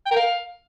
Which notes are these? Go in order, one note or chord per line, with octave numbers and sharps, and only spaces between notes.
G5
A#4
F5